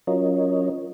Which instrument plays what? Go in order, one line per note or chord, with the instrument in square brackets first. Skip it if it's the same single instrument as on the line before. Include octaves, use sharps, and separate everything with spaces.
[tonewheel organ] F#3 C#4 F4 A#4 C#5 D#5